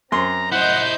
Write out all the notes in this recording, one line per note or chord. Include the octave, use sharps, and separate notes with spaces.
F#2 C4 A#5 C6
E4 C5 D#5 F#5 G6